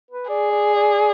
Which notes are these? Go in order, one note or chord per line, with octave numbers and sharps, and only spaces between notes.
B4
G#4 D5
D5
D5